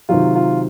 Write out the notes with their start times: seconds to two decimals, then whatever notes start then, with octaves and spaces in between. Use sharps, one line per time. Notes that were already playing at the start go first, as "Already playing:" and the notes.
0.09 C3 D#3 F#3 F4
0.35 F4